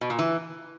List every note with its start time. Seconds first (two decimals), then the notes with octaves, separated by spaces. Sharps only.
0.01 B2
0.10 A#2
0.19 E3